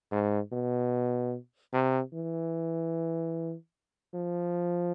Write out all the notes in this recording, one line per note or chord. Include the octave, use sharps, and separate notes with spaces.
G#2
B2
C3
E3
F3